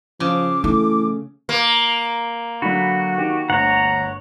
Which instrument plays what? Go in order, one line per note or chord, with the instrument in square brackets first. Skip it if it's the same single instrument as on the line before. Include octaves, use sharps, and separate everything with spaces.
[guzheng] C#3 [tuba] F3 [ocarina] D6
[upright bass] E3 [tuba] A3
[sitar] A#3
[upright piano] D3 F#3 [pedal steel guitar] F#4 [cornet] B5
[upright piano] D#3 [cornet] G4
[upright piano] G1 D2 [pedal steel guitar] C#5 F#5 [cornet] A#5